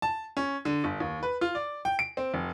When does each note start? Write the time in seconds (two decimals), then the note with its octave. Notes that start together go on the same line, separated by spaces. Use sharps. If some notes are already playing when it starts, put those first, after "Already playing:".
0.02 A5
0.37 C#4
0.65 D3
0.84 G1
1.00 D#2
1.23 B4
1.41 F4
1.55 D5
1.85 G5
1.99 D7
2.17 C4
2.34 F1